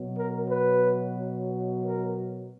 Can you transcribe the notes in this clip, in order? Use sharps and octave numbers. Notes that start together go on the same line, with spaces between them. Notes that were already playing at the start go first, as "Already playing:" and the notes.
Already playing: B2 F#3
A#4
B4
A#4